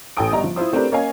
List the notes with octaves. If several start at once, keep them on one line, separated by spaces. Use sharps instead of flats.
A1 A4 G5 G#5 D#6 D7
G1 G3 D#5 A#5
F3
E4 F4 C5 D#6
A3 C4 D4 G4 A#4 B4
A#3 C#4 C#5 D#5 F5 G#5